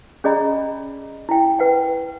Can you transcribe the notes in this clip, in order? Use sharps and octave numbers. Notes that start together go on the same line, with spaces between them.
C#4 G#4 D5 D#5 A#5 B5
E4 G5
B4 F#5 G5